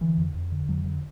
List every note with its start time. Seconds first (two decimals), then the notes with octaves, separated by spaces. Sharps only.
0.01 D3 E3
0.17 F2
0.34 F2
0.52 D3
0.68 F2 F#3
0.85 D3